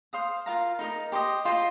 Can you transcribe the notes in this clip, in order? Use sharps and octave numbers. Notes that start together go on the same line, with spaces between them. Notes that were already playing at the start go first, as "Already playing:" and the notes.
C5 F5 D#6
F4 A#4 F5 A#5
D#4 A#4 D#5
G4 C5 D#5
F4 C5 D#5 C6